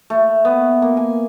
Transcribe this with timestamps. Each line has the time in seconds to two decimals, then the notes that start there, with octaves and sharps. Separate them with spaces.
0.10 A3
0.45 B3
0.82 A#3
0.97 G#5